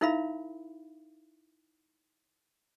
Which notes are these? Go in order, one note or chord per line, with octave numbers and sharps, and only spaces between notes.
D#4 E4 A#4 E5 F5 B5